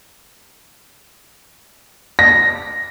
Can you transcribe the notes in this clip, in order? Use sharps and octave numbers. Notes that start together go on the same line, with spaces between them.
A#6